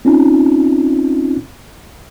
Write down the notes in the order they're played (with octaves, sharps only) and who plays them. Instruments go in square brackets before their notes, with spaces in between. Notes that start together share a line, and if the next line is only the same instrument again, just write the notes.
[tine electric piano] C4 C#4 D#4 F4